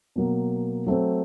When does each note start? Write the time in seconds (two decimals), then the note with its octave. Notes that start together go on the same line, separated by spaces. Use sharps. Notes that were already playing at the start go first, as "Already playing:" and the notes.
0.16 B2 F#3 A#3
0.86 F#3 A3 C4